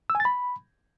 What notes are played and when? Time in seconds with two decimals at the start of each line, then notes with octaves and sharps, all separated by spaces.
0.10 E6
0.15 G#5
0.20 A6
0.25 B5